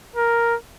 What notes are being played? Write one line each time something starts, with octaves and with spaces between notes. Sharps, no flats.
A#4